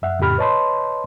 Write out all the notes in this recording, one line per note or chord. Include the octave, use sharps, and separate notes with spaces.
F#2 E5 F#5
F2 A2 C#3 G4 B5 F6
B4 C#5 D#5 A5 B5 C6